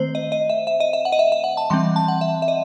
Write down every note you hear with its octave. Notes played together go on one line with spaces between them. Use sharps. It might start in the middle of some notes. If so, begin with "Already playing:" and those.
Already playing: D#3 A3 C4 C5
D#5
D#5
E5
E5
D#5
E5
F#5
D#5
E5
E5
F#5
A5
E3 G3 C4 C6
A5
F#5
E5
E5
D#5